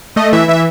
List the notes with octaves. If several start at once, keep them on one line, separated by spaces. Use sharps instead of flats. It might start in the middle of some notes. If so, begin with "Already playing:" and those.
A3 D#5
E3 E5
E3 E5